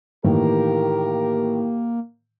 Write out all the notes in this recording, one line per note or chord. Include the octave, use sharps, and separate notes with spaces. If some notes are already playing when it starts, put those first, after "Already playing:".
A2 D#3 E3 A#3 G4 A#4